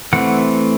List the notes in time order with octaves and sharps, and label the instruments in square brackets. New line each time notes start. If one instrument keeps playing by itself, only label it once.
[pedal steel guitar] E3 A3 C4 F#5